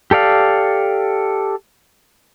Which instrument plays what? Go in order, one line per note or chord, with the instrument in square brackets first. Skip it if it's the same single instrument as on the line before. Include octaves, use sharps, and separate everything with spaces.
[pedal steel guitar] G4 A4 D5 F5